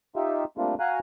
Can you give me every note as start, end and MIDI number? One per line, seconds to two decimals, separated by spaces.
0.16 0.44 63
0.16 0.44 65
0.16 0.44 67
0.16 0.44 76
0.58 0.75 55
0.58 0.75 57
0.58 0.75 58
0.58 0.75 60
0.58 0.75 62
0.58 0.75 65
0.80 0.99 66
0.80 0.99 77
0.80 0.99 80
0.80 0.99 82
0.80 0.99 90